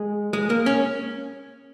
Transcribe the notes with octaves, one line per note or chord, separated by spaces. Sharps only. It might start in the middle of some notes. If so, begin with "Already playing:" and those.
Already playing: G#3
G#3
A#3
C#4